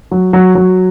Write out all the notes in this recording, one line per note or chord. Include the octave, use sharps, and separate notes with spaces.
F#3
F#3
F#3